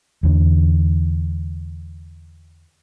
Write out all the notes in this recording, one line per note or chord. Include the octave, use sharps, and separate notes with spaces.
E2 D3